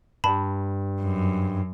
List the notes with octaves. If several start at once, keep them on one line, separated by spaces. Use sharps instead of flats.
G2 A5 B5
F#2